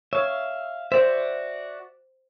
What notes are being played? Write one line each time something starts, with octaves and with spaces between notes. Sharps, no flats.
C#5 E5 F5
F#4 C5 D5 E5